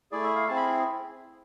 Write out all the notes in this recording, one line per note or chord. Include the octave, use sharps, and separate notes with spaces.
A3 E4 G#4 D5
E5
F5
C4 E4 G#4 A5
B5